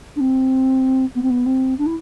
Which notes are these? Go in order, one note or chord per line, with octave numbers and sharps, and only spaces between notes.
D4
C4
B3
C4
B3
C4
D4
E4